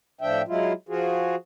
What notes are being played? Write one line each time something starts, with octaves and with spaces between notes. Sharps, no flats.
A2 F3 D4 E5 G5
F#3 G#3 E4 F4
F3 F4 F#4 G#4